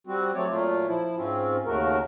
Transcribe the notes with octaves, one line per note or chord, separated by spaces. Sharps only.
G3 C4 F#4
F#3 A3 C4 C#5 D5
A#2 F#3 A3 F4
F3 E4
G#2 C4 C#4 F4
D#2 C#3 A3 F#4 A#4